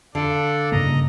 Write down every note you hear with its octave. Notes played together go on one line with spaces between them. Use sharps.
D3 D4 A4 D5 F5
G2 C#3 A#3 D#5 A#5